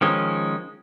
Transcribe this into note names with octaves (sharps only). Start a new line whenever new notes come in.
D#3 F3 G#3 C#4